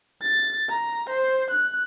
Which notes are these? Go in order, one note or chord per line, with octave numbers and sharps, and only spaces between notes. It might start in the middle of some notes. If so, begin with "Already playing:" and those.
A6
A#5
C5
F#6